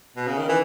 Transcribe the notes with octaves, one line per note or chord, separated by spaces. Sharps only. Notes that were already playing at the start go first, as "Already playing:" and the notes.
B2
C#3
D#3
E3